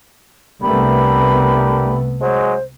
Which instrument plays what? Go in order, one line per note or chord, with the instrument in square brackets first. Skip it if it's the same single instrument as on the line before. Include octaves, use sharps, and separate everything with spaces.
[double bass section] C2 A3 B3 [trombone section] D4 G4 A#4 [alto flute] B5
[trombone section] F#3 G#3 [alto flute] C5